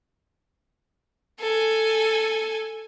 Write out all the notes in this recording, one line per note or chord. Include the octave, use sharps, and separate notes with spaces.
A4 G#5